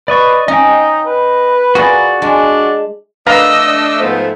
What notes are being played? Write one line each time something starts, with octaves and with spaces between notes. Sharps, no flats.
B4 D5 D#5 C#6
C#4 D#4 D#5 G5
B4
F4 F#4 G#4 A#4 D5
G#3 D4 F4
A3 D4 B4 D#5 F5 A#5 E6
G#2 F3 A3 B3 C5